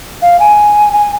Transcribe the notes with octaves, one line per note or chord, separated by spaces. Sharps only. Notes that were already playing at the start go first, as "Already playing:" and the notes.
F5
G#5
G#5